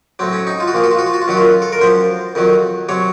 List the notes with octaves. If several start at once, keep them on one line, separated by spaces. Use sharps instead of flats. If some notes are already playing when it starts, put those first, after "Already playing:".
A2 F#3 C4
C#4
D#4
F4
F#4
A#2 F3 F4
F#4
F4
F#4
F4
F#4
F4
F#2 D#3 F#3 F#4
F4
A4
A#4
F#2 F3 C5
F2 D#3 F#3
C3 F#3 C#5